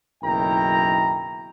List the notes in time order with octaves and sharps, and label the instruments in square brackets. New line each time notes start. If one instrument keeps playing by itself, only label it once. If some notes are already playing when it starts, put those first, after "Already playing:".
[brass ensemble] F#1 B1 D#3 E4 G5 A#5